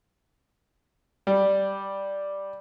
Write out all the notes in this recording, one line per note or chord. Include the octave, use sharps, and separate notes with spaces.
G3